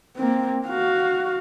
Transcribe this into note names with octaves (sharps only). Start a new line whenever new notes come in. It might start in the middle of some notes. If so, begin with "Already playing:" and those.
A#3 C4
F#4 F5